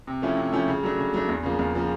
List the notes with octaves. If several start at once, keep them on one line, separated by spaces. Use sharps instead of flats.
C3
F3 A3 C#4 E4
C3
F3 A3 C#4 E4
C#3
F#3 A3 D4
C#3
F#3 A3 D4
E2
C#3 F3 A#3
E2
C#3 F3 A#3